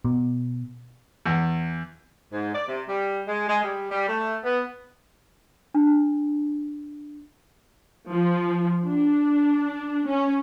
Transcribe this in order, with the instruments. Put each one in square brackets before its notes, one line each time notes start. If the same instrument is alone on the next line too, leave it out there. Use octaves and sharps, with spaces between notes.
[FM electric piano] B2
[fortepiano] E2
[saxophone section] G#2
D5
C3
G3
G#3
G#3
G3
G3
A3
B3
[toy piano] D4
[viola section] F3
D4
C#4